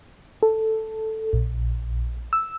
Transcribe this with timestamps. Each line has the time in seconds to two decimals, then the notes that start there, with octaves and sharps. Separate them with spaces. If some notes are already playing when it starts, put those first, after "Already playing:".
0.43 A4
1.33 A#1
2.33 E6